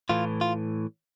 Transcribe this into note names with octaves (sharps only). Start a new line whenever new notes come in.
A2 E3 F4
F4